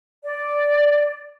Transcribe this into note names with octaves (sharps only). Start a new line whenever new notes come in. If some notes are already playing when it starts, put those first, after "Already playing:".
D5